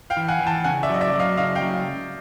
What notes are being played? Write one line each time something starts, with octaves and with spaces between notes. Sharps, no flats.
F5 G5
E3
F#5 G#5
E3
G5 A5
C#3 F#5 G#5
D5 E5
F#3 D#5
D5 E5
F#3
D#5 F5
C#3 D#5 F5
F5 G5
F#3